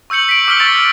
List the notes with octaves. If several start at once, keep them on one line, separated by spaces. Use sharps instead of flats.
C#6 E6 G6 C#7 F#7
B6 D7
D6 E6 F6 B6 D7 G7
C#6 E6 A6 D7 F7